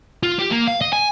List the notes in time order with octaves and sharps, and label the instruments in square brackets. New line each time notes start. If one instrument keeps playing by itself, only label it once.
[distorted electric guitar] F4
G4
A#3
F5
D#5
G#5